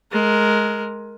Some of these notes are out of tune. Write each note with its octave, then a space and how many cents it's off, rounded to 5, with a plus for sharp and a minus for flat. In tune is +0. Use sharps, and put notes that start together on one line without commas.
G#3 +20 A#4 +0